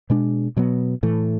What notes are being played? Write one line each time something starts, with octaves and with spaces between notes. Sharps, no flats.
B2 G#3 D4
B2 F#3 B3
A2 E3 A3